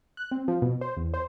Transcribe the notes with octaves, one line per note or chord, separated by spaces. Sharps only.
F#6
C4
F3
B2
C5
E2
C5